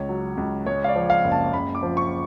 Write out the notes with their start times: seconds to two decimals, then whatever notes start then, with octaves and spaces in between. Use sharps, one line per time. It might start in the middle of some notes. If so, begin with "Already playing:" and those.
Already playing: C#2 C#5
0.09 F#3
0.37 C#2
0.66 G#3 C#5
0.84 F5
0.88 D5
0.96 F3
1.10 F5
1.24 F#1
1.31 A5
1.53 F#1 B5
1.75 D6
1.83 F3
1.97 C#6